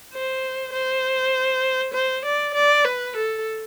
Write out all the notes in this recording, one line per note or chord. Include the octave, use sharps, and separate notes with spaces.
C5
C5
C5
D5
D5
B4
A4